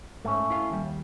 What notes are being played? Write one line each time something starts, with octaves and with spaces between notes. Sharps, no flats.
G#2 A3 C#4
E4 F5
D#2 G3